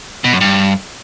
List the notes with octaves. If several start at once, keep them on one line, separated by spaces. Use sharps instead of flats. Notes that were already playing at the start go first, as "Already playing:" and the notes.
B2
F#2
G2